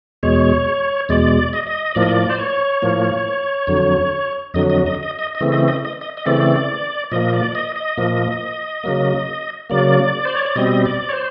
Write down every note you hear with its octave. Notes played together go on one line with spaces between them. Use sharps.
E2 B2 G#3 C#5
E2 B2 G#3 D5
D#5
D#5
A2 F3 A#3 D5
D#5
D5
C5
C#5
A2 F3 A#3
F2 D3 F#3
F2 D3 F#3 D#5
D#5
D#5
D#5
D#5
D#5
C#3 E3 A3 C4
D#5
D#5
D#5
D#5
D#5
C#3 E3 A3 C4 D5
A#2 F3 A#3 D#5
D5
D#5
D#5
A#2 F3 A#3
C#3 F#3 A#3
C#3 F#3 A#3 D5
C5
C#5
D5
B2 G3 C4 D#5
D5
C#5
C5